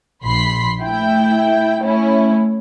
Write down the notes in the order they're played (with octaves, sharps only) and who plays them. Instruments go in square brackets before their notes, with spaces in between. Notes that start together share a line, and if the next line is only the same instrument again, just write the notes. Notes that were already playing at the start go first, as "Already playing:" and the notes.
[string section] A#1 B5 C6 B6 C7
A3 E4 G5
A3 C#4 E4